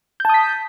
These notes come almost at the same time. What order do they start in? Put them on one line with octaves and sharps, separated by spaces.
G6 A5 D#6 B6